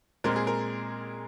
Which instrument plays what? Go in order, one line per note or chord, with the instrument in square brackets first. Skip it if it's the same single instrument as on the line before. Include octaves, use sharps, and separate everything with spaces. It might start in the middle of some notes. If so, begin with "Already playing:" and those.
[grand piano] A#2 G#3 C4 A#4
G#4
A#4